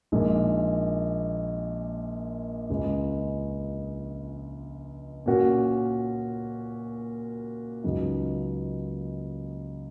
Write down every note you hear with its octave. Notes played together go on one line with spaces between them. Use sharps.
A#1 A#2 G#3 D#4
C#2 C#3 G#3
A#2 A#3 C#4 F#4
C#2 C#3 F#3 D#4